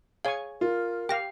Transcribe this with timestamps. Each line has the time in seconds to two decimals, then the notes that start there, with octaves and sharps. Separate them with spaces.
0.25 G#4 C#5 F5 G#5 C#6
0.61 F4 A#4
1.09 G4 F5 G5 A#6